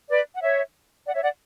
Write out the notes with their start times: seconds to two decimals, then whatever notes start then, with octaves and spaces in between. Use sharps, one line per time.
0.10 B4 D5
0.35 F#5
0.42 C#5 E5
1.07 D5 F#5
1.14 C#5 E5
1.23 D5 F#5